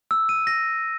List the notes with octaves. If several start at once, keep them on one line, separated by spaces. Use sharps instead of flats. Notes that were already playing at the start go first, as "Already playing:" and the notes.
E6
D#7
A#6